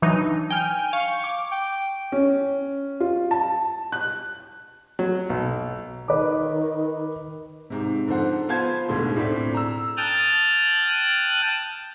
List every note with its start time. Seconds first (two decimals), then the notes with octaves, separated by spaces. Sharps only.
0.02 E3 F#3 D4 D#4
0.50 G5 G#5 F6 G6
0.93 F5 C#6
1.24 D6
1.51 G5
2.12 C#4
3.00 F4
3.31 A5
3.92 F#6
4.99 F#3
5.30 B1
6.08 D#3 B4 D6
7.70 G#2 C3
8.07 G#2 D3 F3 C5 F#5
8.49 B3 F4 C5 A5 G#6
8.89 D1 G#2 B2 D3 C6
9.16 A2 C4 D4 B6
9.54 A#5 E6
9.97 G5 A5 D#6 F6 F#6